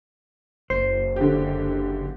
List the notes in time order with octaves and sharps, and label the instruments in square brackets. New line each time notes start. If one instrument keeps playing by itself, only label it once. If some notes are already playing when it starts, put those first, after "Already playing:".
[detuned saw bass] F#1 [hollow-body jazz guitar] C5
[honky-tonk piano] D3 G4